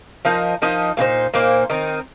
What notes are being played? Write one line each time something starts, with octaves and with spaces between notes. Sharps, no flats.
F3 D#4 A#4 D#5
F3 D#4 A#4 D#5
A#2 A#3 D#4 C5
A#2 A#3 D#4 C5
D#3 C4 D#4